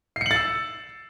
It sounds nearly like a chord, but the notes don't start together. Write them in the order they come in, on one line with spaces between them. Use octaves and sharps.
C7 C#7 F#7 A6 E6